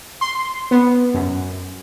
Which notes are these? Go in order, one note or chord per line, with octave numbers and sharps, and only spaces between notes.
C6
B3
F#2